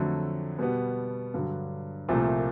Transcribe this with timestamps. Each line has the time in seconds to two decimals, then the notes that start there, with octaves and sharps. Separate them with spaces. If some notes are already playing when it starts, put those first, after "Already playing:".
Already playing: F2 D3 F#3 A3
0.59 B2 G3 B3
1.34 G2 D3 F#3
2.09 C2 A#2 F3 A3